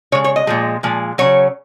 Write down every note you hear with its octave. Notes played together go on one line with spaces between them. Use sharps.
C#3 G#3 C#5
C#5
D#5
A#2 F3 G#3
A#2 F3 G#3
C#3 F#3 C#5